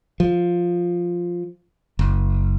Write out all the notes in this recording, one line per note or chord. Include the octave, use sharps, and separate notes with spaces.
F3
F#1